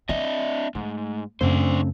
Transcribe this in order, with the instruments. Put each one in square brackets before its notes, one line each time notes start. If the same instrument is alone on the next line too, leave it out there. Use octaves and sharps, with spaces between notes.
[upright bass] C4 [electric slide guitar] D4 D#5 E5
[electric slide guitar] G#2 [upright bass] A3
[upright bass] F#2 [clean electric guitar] C#3 A3 C4 [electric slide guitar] D4 C5